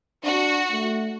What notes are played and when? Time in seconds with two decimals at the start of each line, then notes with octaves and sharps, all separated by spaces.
0.24 D4 F#4
0.71 A3